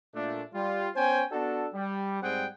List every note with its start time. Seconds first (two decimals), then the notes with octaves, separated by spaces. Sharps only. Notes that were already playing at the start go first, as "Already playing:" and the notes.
0.14 A#2 A3 D4
0.54 G3 F4
0.96 B3 C#4 C5 G5 G#5
1.32 B3 D4 F#4 A4
1.74 G3
2.23 G#2 G3 C4 G#4 F#5 G5